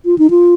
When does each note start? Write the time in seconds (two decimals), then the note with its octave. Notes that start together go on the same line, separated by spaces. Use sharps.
0.05 F4
0.18 D#4
0.30 F4